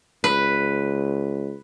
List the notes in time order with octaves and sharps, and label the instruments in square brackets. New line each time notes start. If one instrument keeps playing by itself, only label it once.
[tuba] C#2 [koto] B4